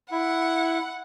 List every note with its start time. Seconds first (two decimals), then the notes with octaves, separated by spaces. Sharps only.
0.11 E4 F#5